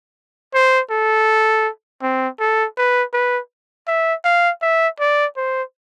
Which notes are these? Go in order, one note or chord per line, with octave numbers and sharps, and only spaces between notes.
C5
A4
C4
A4
B4
B4
E5
F5
E5
D5
C5